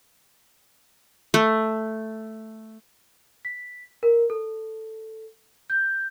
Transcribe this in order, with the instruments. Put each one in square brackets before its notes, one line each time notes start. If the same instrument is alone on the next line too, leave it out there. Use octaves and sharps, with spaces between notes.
[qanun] A3
[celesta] B6
A#4
A4
G6